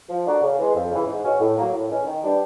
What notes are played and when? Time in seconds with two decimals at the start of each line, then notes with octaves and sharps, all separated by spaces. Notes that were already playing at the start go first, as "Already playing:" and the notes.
0.09 F3
0.25 A3 D4 F#4 A#4
0.41 C#3
0.57 E3 G#3
0.74 F2
0.90 C#3 E3
1.06 G#2
1.23 E3 G#3 C#4 F#4
1.39 A2
1.56 F#3 A#3
1.72 A2
1.89 E3 G#3 C#4
2.05 D#3
2.21 G3 B3 D4 G4